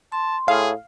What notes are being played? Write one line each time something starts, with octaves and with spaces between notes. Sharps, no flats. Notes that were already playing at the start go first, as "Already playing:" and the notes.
A5 C6
A2 G#4 F5